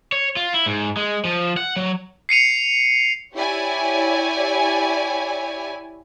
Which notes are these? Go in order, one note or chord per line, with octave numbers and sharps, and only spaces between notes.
C#5
F4
E4
G#2
G#3
F3
F#5
F#3
C7 C#7 D#7 F7
E4 G4 C#5 D5 G#5